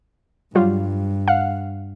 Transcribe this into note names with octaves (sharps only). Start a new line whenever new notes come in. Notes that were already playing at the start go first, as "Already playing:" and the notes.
G2 F#3 G3 F4
F5 F#5